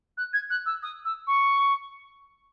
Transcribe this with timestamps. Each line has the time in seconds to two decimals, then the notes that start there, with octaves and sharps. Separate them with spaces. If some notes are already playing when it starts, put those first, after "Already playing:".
0.17 F#6
0.33 G#6
0.50 F#6
0.66 E6
0.83 D#6
1.05 E6
1.27 C#6